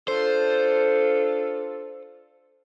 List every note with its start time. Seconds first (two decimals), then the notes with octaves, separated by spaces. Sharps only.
0.08 D4 F4 A4 C5